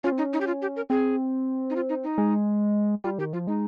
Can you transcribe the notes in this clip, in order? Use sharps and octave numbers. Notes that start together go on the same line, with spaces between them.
C#4 F4
C4
C#4 D#4
D#4
G4
F4
G4
A#4
C4 G#4
D#4
F4
D#4
D#4
G#3
G3 F4
D#3 G4
F3 F4
G#3 D#4